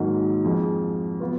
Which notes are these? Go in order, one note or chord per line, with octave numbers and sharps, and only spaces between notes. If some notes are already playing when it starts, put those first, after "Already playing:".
Already playing: G#2 D#3 F#3 A#3
F2 F3 G#3
F#3 B3 F4 B4